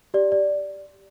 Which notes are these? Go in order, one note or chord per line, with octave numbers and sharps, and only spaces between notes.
G4 D5
D5